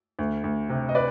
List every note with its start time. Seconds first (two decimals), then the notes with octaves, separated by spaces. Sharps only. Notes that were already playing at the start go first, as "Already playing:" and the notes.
0.19 D2
0.44 D2
0.69 C3
0.89 D#5
0.95 B4 D5